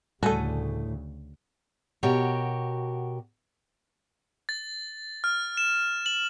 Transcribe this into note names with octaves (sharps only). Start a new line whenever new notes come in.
D2 A2 C#3 G3 A3 F#4 A4 G#5
B2 F#4 G4 A#4 C#5
A6
F6
E7
F#7